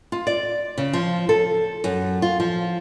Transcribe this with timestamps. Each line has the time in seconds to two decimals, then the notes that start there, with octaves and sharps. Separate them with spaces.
0.12 F4
0.27 D5
0.78 C#3
0.93 F3
1.29 A4
1.84 F#2
2.22 F4
2.40 F3